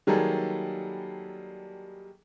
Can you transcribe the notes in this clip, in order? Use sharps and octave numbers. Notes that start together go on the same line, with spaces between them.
D#3 F#3 G3 A#3 G#4 A4